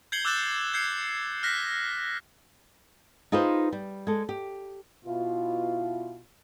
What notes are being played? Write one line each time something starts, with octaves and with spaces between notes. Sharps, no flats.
G6 G#6 C7 C#7 F#7 G7
D6 E6 F#6 G6 A6 E7
G6 G#6 C7 C#7
F6 F#6 A#6 B6
D#4 F4 G#4 B4 C5
G3
G#3 A4
G4
B2 E4 F4